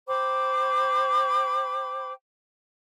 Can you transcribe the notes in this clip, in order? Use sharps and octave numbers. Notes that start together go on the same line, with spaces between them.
C5 G5 B5 D6